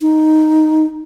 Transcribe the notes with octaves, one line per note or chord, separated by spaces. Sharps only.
D#4